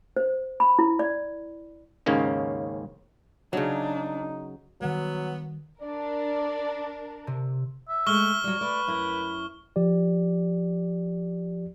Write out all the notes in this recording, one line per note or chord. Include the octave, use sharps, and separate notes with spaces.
C5
B5
E4
D5
D#2 G#2 C#3 A#3 C#4
C#3 F#3 D4 D#4
D#3 F#3 G3 B3
D4 A#4 D5
C3
E5
G#3 A3 C#6 F6 G7
F#3 G3
A3 B4 D5
F#2 E4 A#4
F3 G4 D5